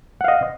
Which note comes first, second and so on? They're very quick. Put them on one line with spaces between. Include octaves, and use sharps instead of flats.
F#5 F5 D#5